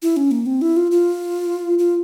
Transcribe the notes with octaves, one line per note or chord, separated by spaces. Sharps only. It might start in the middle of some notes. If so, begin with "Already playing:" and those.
E4
C#4
A#3
C4
E4
F4
F4
F4